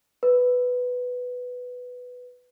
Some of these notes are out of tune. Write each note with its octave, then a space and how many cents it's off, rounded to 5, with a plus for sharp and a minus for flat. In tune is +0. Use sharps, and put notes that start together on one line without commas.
B4 +5